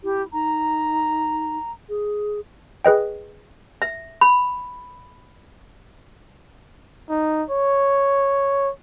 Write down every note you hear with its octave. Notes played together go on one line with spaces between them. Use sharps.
E4 G4
D#4 A#5
G#4
G#4 B4 D#5 G5
E5
B5
D#4
C#5